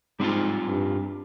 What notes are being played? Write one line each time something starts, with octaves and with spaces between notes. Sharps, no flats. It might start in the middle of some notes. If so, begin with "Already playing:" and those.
G#2 G3 C4 F4
G2